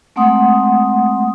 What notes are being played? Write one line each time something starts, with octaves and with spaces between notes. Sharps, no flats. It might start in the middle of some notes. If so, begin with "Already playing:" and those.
G#3 A3 C4 F#5 C6 D#6